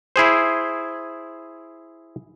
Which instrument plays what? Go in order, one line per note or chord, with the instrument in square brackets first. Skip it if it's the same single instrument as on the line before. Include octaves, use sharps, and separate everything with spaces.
[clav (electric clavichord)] E4 G#4 C5